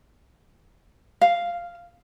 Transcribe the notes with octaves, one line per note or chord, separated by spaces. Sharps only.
F5